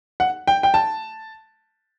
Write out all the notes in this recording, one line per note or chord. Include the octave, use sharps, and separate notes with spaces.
F#5
G5
G5
A5